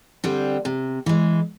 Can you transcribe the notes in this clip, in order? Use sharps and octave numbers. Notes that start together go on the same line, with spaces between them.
D3 G3 C4
C3
E3 G#3